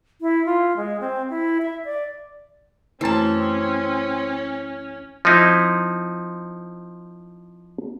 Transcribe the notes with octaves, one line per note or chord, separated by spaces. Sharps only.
E4
F4
G#3
C4
E4
E5
D5
F#2 E3 A3 C4 C#4 C5 A5
F3 C4 D#4 E4